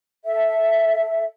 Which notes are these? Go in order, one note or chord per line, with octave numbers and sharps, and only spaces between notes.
A4 E5